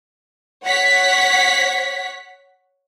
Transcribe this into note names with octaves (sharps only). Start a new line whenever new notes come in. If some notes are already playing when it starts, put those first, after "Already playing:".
C#5 F#5 B6